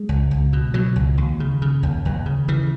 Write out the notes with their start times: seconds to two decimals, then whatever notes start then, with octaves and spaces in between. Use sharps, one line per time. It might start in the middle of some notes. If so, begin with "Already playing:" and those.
Already playing: G#3
0.09 C#2
0.31 C#2
0.53 B2
0.74 B2 F#3
0.96 C#2
1.18 D#2
1.40 C#3
1.62 C#3
1.83 D#2
2.05 D#2
2.26 C#3
2.48 C#3 E3